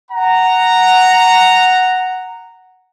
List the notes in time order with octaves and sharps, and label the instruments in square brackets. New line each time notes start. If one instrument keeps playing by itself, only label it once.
[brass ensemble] F#5 A#5